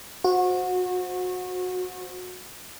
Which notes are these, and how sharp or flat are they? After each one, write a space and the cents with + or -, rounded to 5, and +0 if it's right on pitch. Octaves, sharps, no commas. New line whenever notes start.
F#4 -25 C5 +0